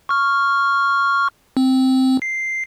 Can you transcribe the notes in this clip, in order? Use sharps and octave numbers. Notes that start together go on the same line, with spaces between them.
C#6 F6
C4
C7